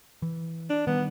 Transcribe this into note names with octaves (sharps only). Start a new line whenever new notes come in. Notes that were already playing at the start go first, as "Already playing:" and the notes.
E3
D4
D#3 G3 B3